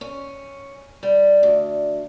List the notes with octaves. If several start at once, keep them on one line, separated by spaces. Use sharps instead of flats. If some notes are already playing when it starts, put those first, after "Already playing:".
C#4
G3
D2